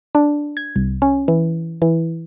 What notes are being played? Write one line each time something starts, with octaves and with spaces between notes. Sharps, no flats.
D4
G#6
C2
C#4
E3
E3